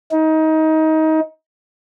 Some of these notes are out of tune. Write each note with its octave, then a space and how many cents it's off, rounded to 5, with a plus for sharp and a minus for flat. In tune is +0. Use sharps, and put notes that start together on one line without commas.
D#4 +25